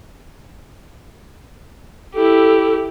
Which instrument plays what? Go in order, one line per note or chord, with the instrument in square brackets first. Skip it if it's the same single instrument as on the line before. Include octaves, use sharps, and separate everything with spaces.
[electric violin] E4 G4 [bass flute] A4